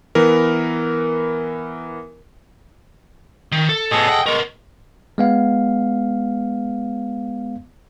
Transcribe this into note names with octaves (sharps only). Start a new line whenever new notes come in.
E3 B3 A#4
D#3
A4
A2 B3 G#4 A4 D#5
F#5 G5
G#3 B3 A#4 C#6
G#3 B3 F5